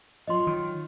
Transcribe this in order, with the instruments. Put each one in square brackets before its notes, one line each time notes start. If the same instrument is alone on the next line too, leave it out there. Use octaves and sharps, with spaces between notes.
[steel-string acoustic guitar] F#3 F4 C#5 [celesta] D#5 C6
[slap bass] D#3